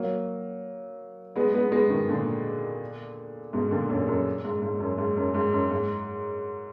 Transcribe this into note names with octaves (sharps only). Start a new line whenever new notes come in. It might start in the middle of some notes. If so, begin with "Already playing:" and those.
Already playing: F#3 A#3
G#3 B3
G#3 B3
G#3 B3
B2 D#3
A#2 D3
G#2 B2
A#2 D3
F#2 A#2
F#2
G#2
G#2
F#2
G#2
F#2
G#2
F#2
G#2